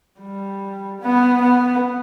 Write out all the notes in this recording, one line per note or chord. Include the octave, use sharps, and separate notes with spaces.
G3
B3
B3